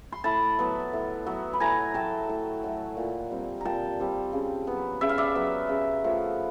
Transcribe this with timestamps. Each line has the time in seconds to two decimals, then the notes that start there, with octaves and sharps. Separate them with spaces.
0.12 C6
0.24 A2 A5 B5
0.59 F#3 B3
0.93 A2
1.26 F#3 B3
1.53 B5
1.60 A2 G#5 A#5
1.94 F#3 A3 G5 A5
2.29 A2
2.64 F#3 A3
2.97 A#2
3.31 G3 C4
3.61 A#2 G5 A5 A#5
4.00 G3 C4
4.33 C#3
4.67 F#3 B3
5.01 C#3 E5
5.09 F5
5.18 D5 E5
5.35 F#3 B3
5.69 C#3
6.04 F3 A3